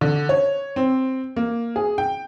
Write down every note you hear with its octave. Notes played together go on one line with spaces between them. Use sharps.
D3
C#5
C4
A#3
G#4
G5